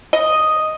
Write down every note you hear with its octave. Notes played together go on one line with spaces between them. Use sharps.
D#5